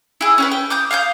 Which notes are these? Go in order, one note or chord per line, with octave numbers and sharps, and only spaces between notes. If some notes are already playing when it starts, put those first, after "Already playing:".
E4 G#4
C#4 G4 B4
G5
D6 D#6 G6
F5 D#6 F#6 G6